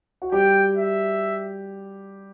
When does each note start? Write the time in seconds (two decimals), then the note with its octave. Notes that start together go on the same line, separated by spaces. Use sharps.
0.22 F#4
0.32 G3 G4 G5
0.77 E5